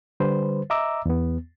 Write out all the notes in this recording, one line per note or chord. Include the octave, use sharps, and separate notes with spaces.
D3 G3 B4 C5
D#5 E5 A#5 D6 E6
E2 B3